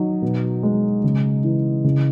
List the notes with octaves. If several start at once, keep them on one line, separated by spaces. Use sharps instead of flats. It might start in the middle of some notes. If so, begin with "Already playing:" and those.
Already playing: D#3 F#3 D#4
B2
G#3
C#3
E3
C#3